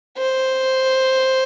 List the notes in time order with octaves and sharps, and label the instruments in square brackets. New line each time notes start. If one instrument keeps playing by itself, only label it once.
[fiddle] C5